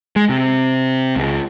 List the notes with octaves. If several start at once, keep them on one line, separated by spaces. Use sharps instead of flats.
G#3
C3
C#2